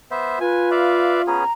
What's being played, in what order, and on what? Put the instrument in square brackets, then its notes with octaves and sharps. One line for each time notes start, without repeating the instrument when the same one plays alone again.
[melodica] B3 C5 E5
[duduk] F4 [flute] B4 [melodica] G#5
[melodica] D5 E5 F5
[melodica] B3 C#4 G#4 [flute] A#5